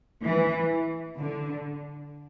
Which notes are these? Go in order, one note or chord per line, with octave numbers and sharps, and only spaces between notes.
E3
D3